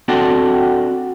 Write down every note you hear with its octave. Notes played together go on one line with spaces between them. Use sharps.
C4 D4 F#4 A4